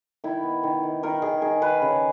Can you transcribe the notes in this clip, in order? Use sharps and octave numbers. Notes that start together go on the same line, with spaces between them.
D#3 E4
B3
D#3
D#3
D#3 A#4
D#3 G#4
D#3 G#4
D#3 B4
C#3